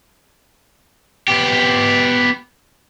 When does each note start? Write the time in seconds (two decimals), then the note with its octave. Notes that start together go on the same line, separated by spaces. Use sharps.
1.28 B3 G4